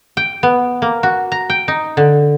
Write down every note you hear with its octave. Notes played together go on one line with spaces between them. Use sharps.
G5
B3
A#3
F#4
A#5
G5
D#4
D3